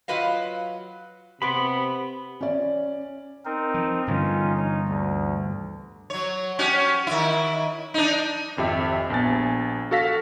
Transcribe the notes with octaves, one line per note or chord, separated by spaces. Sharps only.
F#3 F4 F#4 B4 D#5 F5
C3 B3 G4 B5 C6 D7
C#4 D5
C4 D#4 A#4
F3
G2 D3 E3 C#4 D#4 F4
D#4
D2
F#3 C#5
C#4 F#4 G4
D#3 E4
D4 D#4
G#1 F2 G4 E5
A#1 B3 G#5 A6
F#4 A4 F5 A#6 B6